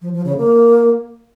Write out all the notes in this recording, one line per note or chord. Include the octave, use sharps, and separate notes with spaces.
F3
F3
C#3
A#3